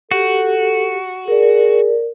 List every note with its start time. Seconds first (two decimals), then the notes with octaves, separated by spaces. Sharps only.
0.11 F#4 G4 A4
1.28 G#4 A#4 D5